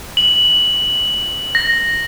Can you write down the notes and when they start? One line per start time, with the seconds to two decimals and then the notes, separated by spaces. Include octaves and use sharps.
0.17 F#7
1.55 A#6